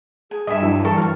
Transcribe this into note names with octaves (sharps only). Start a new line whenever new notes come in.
G#4 G#5
G2 D#5 E5 G#5
F#3 D4 E4
E3 A4 A#4 C#6
F#3 A5 C#6 F6